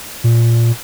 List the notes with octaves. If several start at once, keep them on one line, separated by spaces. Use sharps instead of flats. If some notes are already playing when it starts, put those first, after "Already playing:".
A#2